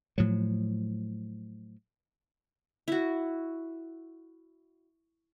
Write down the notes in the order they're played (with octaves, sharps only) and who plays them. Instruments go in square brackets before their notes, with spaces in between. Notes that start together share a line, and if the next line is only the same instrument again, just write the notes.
[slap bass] A2 F3 F#3
[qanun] E4 F#4